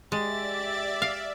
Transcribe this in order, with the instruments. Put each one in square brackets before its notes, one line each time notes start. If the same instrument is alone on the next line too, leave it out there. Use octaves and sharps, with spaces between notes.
[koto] G#3 [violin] G4 A6 [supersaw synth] D5 E5
[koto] F5